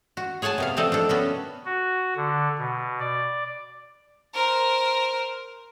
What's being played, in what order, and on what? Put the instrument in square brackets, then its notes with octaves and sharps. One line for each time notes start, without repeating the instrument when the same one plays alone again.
[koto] F#4
G#4 C#5 F#5 G#5 A5
C3 B3 F5
F3 A3 C4 A4 D5 D#5
D4 A4
B3 C#4 F#4
[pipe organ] F#4
D3
B2
D5
[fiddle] A#4 C5